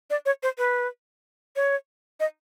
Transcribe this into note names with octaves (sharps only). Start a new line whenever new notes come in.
D5
C#5
C5
B4
C#5
D#5